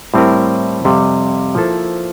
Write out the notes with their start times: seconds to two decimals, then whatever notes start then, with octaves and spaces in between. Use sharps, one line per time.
0.14 A2 G3 C4 E4 A#4
0.85 F2 C3 G3
1.55 F3 A#3 E4 A4 C5